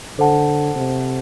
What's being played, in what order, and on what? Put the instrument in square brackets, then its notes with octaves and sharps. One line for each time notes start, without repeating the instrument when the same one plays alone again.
[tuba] D3 [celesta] A4 C5 F#5 A5
[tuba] C3